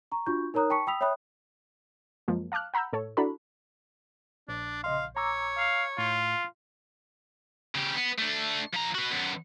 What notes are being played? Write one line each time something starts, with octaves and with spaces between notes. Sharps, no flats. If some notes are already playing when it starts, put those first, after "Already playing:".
A#5 C#6
D4 F4 F#4 C#6 G6
D#4 A#4 C#5 A#5 D#6 F#6
G5 A5 B5 C#6 B6 C#7
G5 B5 D#6 E6 B6 F7
C#5 E5 G5 B5 D#6 F#6
F#2 F3 G#3 A#3
F5 A5 D6 F6 F#6
F#5 A#5 B5 E6 G6
A2 A4 C#5
D4 E4 F#4 A4 A#5 B5
A#1 D4
C#3 D#5 F5 C6
C#5 A#5 D6 E6
F5
A2 F4
C#3 G4
B3
A3 D4
F3 A#5
F#4 B4
F#2 B3